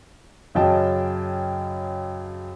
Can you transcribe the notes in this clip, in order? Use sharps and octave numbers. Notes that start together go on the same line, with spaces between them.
F#2 C#3 D#5 G5 A5